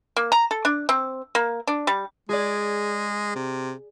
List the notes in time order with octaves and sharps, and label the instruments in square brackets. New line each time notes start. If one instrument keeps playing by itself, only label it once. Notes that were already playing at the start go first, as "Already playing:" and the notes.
[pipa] A#3
A#5
A4
D4
C4
A#3
D4
G3
[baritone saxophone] G#3 [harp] G#4 D5
[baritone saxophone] C3